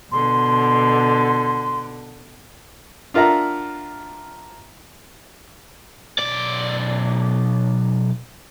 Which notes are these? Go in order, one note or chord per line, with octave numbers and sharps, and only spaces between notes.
B2 D3 C6
D4 F4 A#4 E5 F#5 A#5
B1 D5